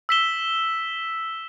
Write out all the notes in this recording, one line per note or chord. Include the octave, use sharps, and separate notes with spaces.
E6 B6 E7 G7